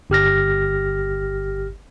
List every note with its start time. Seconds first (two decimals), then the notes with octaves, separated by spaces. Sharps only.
0.10 G1 G4 F6 A#6